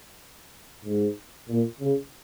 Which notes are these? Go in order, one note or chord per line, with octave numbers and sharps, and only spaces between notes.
G#2
A#2
C#3